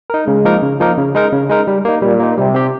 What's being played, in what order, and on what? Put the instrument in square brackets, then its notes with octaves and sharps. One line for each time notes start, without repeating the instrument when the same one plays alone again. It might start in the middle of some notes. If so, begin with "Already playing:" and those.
[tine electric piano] D#4 A#4
[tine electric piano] C#3 [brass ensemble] G#3
[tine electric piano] F3 A#3 D#4 A#4
C#3
F3 A#3 D#4 A#4
C#3
G#3 D#4 A#4
C#3
G#3 D#4 A#4
G3
A#3 D#4
[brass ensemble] A#2 [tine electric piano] G3
[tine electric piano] A#3 D#4
[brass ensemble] C3 [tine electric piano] G3
[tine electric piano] C4 G4